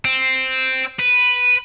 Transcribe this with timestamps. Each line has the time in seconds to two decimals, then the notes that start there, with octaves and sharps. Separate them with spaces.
0.05 C4
0.99 B4